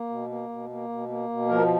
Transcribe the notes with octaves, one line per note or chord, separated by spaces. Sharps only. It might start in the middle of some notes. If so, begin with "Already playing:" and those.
Already playing: A#3
B2
A#3
B2
A#3
B2
A#3
B2
F3 A#4